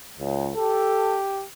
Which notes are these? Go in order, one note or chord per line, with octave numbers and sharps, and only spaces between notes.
C#2
G4 A4